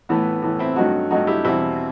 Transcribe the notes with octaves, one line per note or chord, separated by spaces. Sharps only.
A2 E3 A3 B3
A2 E3 A3
C4 E4
G2 F#3 A3 D#4 F#4
G2 F#3 A3 D#4 F#4
E4 G4
E2 B2 G3 C4 E4